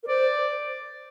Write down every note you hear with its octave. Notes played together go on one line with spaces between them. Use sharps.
A#4
C5 D5